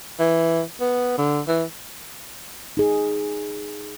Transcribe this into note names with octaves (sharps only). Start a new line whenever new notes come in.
E3
B3
D3
E3
D#4 G#4